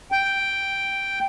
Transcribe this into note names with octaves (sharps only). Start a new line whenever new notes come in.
G5